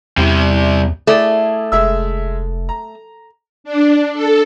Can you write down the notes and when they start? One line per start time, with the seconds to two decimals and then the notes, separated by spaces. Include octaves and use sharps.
0.17 E2 C3 G3
1.07 A3 E4 G#4 D5
1.72 F1 G#3 E5 E6
2.69 A#5
3.64 D4
4.13 A4